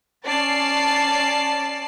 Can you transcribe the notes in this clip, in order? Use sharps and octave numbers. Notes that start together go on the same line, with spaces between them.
C#4 D5 A5 A6 C7